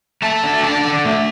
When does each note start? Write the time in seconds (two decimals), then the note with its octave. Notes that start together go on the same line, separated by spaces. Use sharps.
0.22 A3 A5
0.44 D3
0.63 D4 A5
0.85 D3
1.05 A3